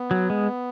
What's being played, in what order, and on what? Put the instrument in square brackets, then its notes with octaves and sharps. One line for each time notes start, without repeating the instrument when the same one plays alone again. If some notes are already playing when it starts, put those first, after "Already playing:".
Already playing: [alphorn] B3
[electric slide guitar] F#3
G#3